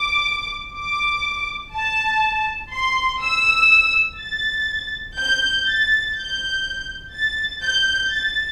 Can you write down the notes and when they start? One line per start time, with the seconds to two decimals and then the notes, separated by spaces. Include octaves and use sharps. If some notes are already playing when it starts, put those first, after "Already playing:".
Already playing: D6
0.75 D6
1.73 A5
2.72 C6
3.21 E6
4.19 A6
5.17 G6
5.66 A6
6.15 G6
7.13 A6
7.61 G6
8.10 A6